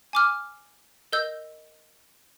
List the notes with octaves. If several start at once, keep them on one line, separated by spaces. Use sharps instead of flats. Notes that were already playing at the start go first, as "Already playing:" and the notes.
G#5 D6 F6
A#4 D#5 E6 G6